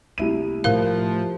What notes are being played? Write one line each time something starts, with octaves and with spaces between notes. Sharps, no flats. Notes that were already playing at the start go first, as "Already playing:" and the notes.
C2 A3 A#3 E4 D#7
A2 F3 A3 A#4 F5